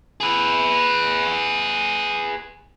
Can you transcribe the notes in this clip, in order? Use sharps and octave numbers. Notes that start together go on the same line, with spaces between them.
G#4 B4